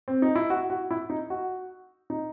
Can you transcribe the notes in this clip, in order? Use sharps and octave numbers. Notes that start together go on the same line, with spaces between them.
C4
D#4
E4
F#4
F#4
E4
D#4
F#4
D#4